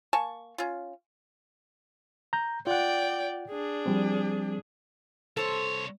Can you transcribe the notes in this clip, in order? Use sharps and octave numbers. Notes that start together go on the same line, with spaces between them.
A#3 G#5 A5 C#6
C#4 F4
A#5 G6
F4 D5 F#5 G5
D4 G#4
F3 G3 C4
C2 A4 C5 C#5